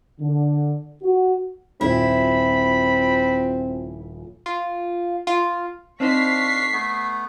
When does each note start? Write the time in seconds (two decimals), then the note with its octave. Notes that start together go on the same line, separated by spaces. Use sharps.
0.20 D3
1.03 F#4
1.81 D#1 A#1 C4 E4 B5
4.46 F4
5.27 F4
6.00 C4 D4 D#4 C5 F5 C#6 B6 C7
6.72 A3 B3